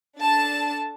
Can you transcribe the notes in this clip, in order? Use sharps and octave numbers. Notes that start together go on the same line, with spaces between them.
D4 A4 A5